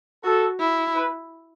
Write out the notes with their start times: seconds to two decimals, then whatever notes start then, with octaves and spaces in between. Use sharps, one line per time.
0.24 F#4 A4
0.60 E4
0.95 B4